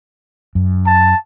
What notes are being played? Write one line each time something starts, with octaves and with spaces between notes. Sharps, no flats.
F#2
A5